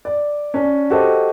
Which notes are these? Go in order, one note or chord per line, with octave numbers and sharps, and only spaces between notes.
D5
C#4 D4
F#4 G4 A4 C5 D#5